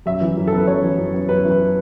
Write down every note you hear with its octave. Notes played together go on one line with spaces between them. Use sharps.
F#2 E5
E3
F#2
B3 A4
B4
F#2 C#5
E3
F#2
B3
F#2 B4
E3
B4